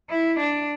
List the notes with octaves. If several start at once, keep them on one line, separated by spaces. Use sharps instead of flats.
E4
D4